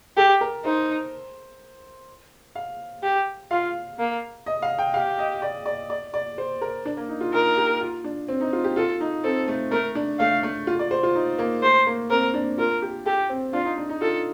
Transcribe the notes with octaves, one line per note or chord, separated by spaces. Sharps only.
G4 A4
A#4
D#4 C5
F5
G4
F4 F5
A#3
D#5
F5
G5
G4 F5
D#5
D5
D5
D5
D5
C5
A#4
D4
A#3
D#4
F4
D#4 A#4
G4
F4
D4
C4
D#4
F4
G4
F4 A4
D#4
C4 A4
A3
A3 A#4
D4
A3 F5
A3
F4
D5
C5
F4
D#4
A#3
A3 C5
A#3
C4 A#4
D4
F4 A#4
G4
G4 A4
C4
D4 F4
D#4
D4
D#4
F4 A4